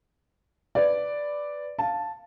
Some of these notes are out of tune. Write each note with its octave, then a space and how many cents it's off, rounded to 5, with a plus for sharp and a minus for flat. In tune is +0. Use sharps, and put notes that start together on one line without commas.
B4 +10 D5 +0
F5 +5 A5 +0